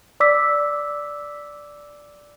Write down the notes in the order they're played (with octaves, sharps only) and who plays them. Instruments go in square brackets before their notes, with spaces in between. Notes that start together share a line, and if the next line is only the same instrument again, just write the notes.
[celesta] D5 D6 E6 B6